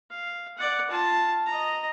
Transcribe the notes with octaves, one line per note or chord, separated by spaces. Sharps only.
F5
D5 F#5
F4 A5
D#5 A#5